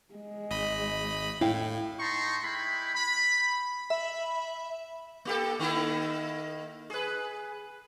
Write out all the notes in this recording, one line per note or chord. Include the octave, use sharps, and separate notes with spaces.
G#3
G#1 D#5 B5
A2 E4 F5 G5
D#4 A5 A#5 C6 C#6
G#3 E4 G5 B5
B5
E5 B5
A#3 G4 A4
D#3 A#3 E4
G#4 B4